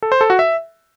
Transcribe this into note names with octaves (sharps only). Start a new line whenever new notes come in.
A4
C5
A4
F#4
E5